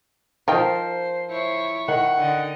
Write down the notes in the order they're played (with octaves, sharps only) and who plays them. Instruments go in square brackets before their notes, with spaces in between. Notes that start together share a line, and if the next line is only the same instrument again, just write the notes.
[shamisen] D#3 D#4 G5 [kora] F3 A#4 [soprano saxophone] C5
[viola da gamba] E4 C#5 [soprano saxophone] C5
[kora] D#3 [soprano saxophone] F#5
[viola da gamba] D3 D#4 D#5